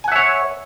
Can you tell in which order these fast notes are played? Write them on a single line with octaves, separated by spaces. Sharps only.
G#5 F#5 E5 C#5